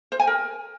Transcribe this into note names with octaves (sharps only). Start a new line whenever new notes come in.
C5
G#5
A#4